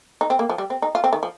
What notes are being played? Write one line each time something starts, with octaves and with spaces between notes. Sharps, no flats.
D#4
C4
A#3
F3
G3
C4
D#4
F4
C4
D#3
F3